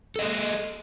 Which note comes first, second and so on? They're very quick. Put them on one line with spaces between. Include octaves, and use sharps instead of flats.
A4 D#5 G#4